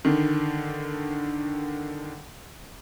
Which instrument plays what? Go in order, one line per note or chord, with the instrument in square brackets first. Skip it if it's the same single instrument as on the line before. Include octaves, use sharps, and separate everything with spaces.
[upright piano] D3 D#3